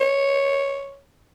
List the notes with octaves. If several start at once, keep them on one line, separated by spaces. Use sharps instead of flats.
C#5